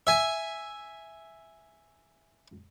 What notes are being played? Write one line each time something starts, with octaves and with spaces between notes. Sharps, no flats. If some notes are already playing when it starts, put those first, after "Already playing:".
E5 G#5